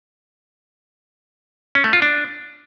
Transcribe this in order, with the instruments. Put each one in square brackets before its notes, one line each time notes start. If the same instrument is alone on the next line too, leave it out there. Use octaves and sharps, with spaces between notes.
[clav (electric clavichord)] C#4
A3
F4
D4